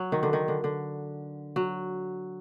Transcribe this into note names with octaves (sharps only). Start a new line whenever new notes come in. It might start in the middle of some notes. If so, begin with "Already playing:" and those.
Already playing: F#3
D#3
D3
D#3
D3
D3
F#3